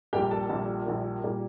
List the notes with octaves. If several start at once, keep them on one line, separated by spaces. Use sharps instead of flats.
A#1 A#2 G3 A#3 G4 G5
A4 A5
A#1 A#2 G3 A#3
A#1 A#2 G3 A#3
A#2 G3 A#3